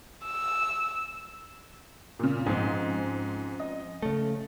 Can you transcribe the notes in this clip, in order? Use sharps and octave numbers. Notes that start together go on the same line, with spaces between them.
E6
A#2 C#3
G#2 F3 C4 C#4
D#5
C#3 A3